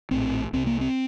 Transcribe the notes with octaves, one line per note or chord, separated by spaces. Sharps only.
A#1 A2 C4
C2 C3 C4
A#3
C4